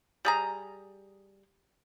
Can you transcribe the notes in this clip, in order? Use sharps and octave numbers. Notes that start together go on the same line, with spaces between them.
G3 G#4 A#5